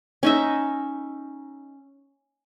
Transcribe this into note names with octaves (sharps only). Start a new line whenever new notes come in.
C#4 D#4 E5